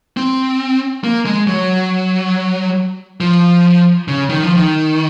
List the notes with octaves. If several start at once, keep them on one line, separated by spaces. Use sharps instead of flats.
C4
A#3
G#3
F#3
F3
C#3
D#3
F3
D#3